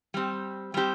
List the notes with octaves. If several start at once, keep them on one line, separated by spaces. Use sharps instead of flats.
G3 C4 G4
G3 C4 G4